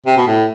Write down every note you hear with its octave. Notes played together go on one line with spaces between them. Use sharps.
C3
B2
A2